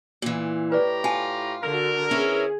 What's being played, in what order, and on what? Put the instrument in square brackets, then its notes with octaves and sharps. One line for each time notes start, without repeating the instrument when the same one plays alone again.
[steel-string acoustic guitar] A#2 E3
[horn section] A2 G4 A#5 [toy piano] B4 D5
[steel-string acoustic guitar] F4 [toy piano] G#5 A5
[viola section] D3 F#4 [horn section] A#4
[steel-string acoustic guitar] C#4 E4 B4 [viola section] G#4